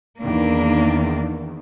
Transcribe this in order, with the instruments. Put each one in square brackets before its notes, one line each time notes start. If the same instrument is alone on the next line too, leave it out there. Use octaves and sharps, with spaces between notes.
[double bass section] E2 D#3 [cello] A#3 D4